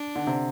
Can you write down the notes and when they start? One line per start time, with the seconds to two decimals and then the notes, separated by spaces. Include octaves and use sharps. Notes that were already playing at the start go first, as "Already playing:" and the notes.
Already playing: D4
0.16 D3
0.27 C3